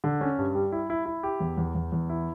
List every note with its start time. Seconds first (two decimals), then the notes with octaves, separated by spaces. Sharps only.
0.04 D3
0.21 C#4
0.38 G2
0.54 G3
0.72 E4
0.90 E4
1.06 E4
1.23 G4
1.40 E2
1.57 E2
1.75 E2
1.92 E2
2.09 E4